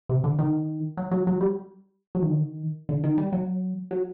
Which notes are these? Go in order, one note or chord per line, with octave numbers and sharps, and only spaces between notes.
C3
D3
D#3
F#3
F#3
F#3
G3
F#3
D#3
D3
D#3
D3
D#3
G3
F#3
F#3